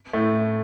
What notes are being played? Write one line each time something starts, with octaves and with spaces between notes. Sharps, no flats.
A2 A3